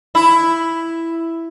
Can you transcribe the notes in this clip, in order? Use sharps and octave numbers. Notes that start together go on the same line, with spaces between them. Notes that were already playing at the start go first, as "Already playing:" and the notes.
E4